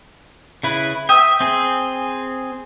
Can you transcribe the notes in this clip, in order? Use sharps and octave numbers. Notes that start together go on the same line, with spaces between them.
C#3 E4 B4
E5 G5 D#6
C4 G#4